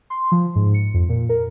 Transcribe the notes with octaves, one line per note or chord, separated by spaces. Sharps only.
C6
F3
G#2
C#7
F2
A#2
A#4